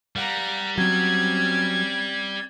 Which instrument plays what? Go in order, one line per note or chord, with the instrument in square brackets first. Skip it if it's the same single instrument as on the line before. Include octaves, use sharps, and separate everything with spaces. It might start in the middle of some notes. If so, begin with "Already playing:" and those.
[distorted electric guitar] G3 [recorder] F5 [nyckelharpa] F#5 A#5
[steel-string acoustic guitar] F#3 [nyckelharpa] C4 C#4 [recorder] G#6